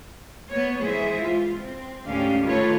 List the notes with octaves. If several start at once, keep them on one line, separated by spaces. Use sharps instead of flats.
B3 C#5
E3 G#3 G#4 C5 E5
F4
C4
D2 G#2 C#4 D4 G4 F5
D#3 A3 F4 A4 B4 C#5